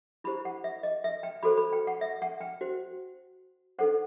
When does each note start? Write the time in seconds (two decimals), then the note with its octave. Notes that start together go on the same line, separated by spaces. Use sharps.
0.24 E4 G4 C5 B5
0.45 F#5
0.64 E5
0.83 D#5
1.04 E5
1.23 G5
1.43 F#4 A4 C5 B5
1.57 B5
1.73 G5
1.87 F#5
2.01 E5
2.22 F#5
2.41 G5
2.61 F#4 C5
3.79 D#4 A4 C5 F#5